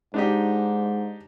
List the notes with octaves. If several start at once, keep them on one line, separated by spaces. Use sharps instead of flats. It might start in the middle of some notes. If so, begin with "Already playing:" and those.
G#2 D4 D#4 G4